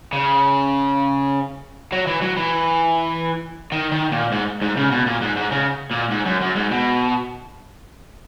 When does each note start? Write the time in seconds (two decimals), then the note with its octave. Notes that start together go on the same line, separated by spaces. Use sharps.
0.13 C#3
1.92 F#3
2.08 E3
2.22 F#3
2.37 E3
3.72 D#3
3.91 D#3
4.12 A#2
4.32 G#2
4.62 G#2
4.77 C#3
4.91 B2
5.06 A#2
5.21 G#2
5.36 G#2
5.51 C#3
5.91 A#2
6.11 G#2
6.26 F#2
6.41 F#2
6.56 G#2
6.71 B2